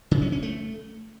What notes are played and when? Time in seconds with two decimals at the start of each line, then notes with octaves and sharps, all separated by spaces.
0.11 C#3
0.22 C#4
0.32 C#4
0.42 A3